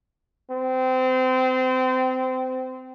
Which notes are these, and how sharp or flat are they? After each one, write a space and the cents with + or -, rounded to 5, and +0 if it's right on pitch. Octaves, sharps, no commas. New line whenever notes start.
C4 -25